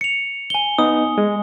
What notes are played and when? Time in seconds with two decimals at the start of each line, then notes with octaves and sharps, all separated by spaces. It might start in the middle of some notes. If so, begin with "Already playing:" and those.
0.01 C#7 F7
0.50 G#5 G7
0.78 B3 D#4 D#6
1.18 G#3